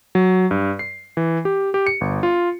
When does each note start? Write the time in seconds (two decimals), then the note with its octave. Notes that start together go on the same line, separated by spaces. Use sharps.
0.15 F#3
0.51 G2
0.79 C7
1.17 E3
1.45 G4
1.74 G4
1.87 C#7
2.01 G1
2.23 F4